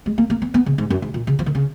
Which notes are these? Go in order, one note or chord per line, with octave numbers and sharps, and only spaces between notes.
G#3
A#3
A#3
B3
B3
C#3
G#2
F#2
G#2
A#2
C#3
F3
D#3
C#3